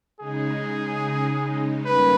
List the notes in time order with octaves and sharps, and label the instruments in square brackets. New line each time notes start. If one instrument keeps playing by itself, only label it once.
[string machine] C#3 G#3 D#4 [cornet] G#4
[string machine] G2 D#3 G3 A#3 C#4 [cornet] B4